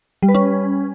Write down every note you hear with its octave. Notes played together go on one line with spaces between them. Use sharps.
G3
B4
C#4